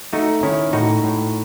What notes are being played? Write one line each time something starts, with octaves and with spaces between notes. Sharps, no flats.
A3 D#4 F#4
D#3 C#4 E4
A2 D#4 F#4
A2